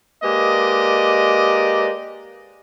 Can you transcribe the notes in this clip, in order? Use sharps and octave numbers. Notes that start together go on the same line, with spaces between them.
G#3 A#3 G4 B4 D5 D#5